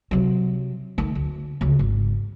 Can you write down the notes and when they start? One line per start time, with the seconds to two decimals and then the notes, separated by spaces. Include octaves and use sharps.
0.11 C3 F#3
0.98 D#3 A3
1.15 D2
1.61 D2 C#3
1.79 G#1